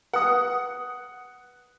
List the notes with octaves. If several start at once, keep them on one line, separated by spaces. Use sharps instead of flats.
B4 F#5 D#6